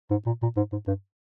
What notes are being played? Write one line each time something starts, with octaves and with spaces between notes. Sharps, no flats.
G#2
A#2
A#2
G#2
G#2
G2